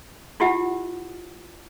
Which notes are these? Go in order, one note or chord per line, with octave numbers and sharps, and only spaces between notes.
E4 F4 G4 E5 F#5